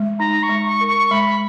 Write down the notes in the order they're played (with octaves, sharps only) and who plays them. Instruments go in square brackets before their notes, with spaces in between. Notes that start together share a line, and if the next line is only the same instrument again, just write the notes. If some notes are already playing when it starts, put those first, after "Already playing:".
Already playing: [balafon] G#3
[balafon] D#4 [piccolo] A#5
[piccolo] C#6
[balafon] G#3
[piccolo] C#6
[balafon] A#4
[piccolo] C#6
[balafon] G#3 [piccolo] B5